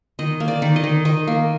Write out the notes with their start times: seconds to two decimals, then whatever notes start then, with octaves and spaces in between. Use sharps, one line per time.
0.19 D#3 D#5
0.40 A#3
0.48 D5
0.62 D#3
0.76 D#5
0.84 D#3
1.05 D#3 D#5
1.27 A#3